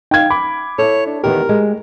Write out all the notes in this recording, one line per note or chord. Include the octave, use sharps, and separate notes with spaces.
D#4 F5 G5 G#6
B5 D6
E4 A4 C#5
D4
E2 D#3 B3 G4 A#4
G#3